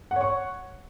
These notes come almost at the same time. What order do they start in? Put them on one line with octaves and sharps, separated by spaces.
F#5 C#5 C#6